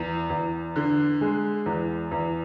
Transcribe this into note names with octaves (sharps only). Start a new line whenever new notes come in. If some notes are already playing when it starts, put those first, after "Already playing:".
Already playing: E2
E2
D3
G#3
E2
E2